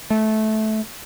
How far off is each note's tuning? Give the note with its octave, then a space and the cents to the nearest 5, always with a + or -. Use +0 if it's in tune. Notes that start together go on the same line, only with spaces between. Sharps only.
A3 -15